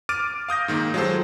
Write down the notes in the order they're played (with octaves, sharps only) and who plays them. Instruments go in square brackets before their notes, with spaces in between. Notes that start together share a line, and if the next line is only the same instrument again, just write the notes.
[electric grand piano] D6 F6 A6 D7 D#7
F5 D#6 G6 A#6
G#2 D#3 A#3
F#3 G#3 F4 G4 A4 C5